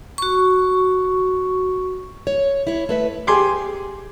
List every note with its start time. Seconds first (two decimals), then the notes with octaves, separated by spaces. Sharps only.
0.18 F#4 C#6
2.27 C#5
2.67 E4 C#5
2.89 A3 B4 E5
3.27 G4 G#4 G#5 C6 D6